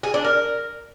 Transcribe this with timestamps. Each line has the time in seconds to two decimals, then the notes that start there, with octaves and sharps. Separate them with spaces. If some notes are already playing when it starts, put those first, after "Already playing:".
0.03 G#4
0.14 D4
0.25 A#4